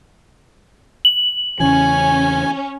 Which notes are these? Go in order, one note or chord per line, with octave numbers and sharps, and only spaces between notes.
F#7
E2 C#3 E3 C#4 G#5